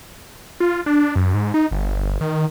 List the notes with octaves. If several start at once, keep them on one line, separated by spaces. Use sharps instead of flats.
F4
D4
F#2
G#2
D#4
G1
D#3